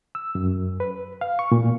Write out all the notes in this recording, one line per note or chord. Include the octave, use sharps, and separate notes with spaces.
E6
F#2
B4
F5
C#6
A#2